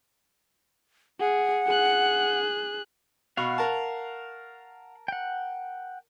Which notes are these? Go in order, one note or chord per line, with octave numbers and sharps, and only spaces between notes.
G#4 F#5
G#4 F#6
B2 F5 F#5 C#6
A#4 A5
F#5 G5